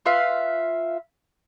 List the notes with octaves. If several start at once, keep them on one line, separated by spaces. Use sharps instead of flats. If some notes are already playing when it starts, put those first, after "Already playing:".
F4 B4 E5 F5